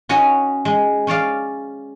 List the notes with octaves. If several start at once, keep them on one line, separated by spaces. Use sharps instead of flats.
C#4 F#4 C#5 D#5 G#5
G#3
C#4 C#5 D5 F5